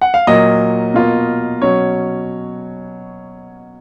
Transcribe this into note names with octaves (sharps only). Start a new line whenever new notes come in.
F#5
F5
A#2 F#3 A#3 D#5
B2 A#3 F4
B2 F#3 C#4 C#5